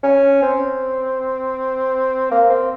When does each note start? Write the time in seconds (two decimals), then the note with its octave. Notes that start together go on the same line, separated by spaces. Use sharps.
0.03 C#4
0.42 C4
2.31 A#3
2.50 C4